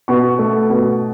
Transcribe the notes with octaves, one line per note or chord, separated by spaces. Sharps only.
B2 C#6
A3
B2